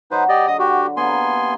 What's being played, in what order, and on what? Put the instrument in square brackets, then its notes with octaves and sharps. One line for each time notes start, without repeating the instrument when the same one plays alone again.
[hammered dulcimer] F#3 [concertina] D#4 B4 C5
[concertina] G4 D5 D#5
[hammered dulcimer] D3 [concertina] D#5 D#6
[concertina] F#4 G4
[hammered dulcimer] C3 A#3 [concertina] B3 G#5 C6